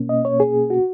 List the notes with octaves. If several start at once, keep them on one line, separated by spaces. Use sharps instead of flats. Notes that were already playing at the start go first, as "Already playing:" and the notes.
Already playing: B2 A#3 C#4
D#5
C#5
G#4
F#4